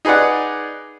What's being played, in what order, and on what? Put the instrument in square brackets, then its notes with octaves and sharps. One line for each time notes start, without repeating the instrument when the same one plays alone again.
[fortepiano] D#4 G#4 B4 D5 F#5